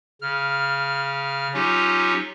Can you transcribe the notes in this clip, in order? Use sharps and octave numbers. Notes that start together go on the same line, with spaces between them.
C#3 F6
F#3 C#4 D#4 F4 G4